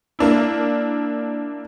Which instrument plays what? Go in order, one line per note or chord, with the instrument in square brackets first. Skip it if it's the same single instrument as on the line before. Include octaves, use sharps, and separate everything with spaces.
[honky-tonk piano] A#3 D4 E4